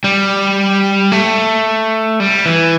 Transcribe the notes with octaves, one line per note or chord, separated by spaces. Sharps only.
G3
A3
G3
E3